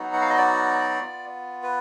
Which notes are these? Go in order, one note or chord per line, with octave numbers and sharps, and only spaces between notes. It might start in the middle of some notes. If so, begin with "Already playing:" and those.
Already playing: F#3 B3 D#4 F#4
F#5
F5
D#5
D5
B3 F4
B4